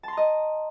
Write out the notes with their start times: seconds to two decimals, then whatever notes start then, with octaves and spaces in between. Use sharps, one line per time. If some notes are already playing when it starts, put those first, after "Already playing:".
0.03 A5
0.08 C6
0.13 A#5
0.17 D#5